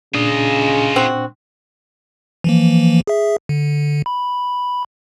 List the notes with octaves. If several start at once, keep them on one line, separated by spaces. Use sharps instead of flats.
A#2 C#3 D4 F4 D#5
C4 F#4
E3 F3 A#3
G#4 E5
D3
B5